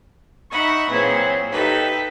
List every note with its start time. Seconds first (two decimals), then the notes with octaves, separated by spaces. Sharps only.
0.50 D#4 E5 F#5 B5 C#6
0.91 A#2 E3 F#3 C4 G#4
1.51 D#4 G4 A4 B4 E5